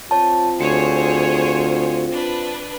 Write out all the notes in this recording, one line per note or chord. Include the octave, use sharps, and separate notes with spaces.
C4 F4 C#5 A5
D2 G#4 C5 C#5 C#7
D4 B4